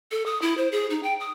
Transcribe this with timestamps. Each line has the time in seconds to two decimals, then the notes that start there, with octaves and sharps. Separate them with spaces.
0.11 A4
0.26 D#6
0.42 E4
0.57 C5
0.72 G#4
0.90 D#4
1.03 G5
1.20 D#6